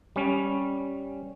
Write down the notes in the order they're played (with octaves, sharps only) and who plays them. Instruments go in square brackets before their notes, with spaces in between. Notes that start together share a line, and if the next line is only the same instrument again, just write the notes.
[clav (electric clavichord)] G3 C#4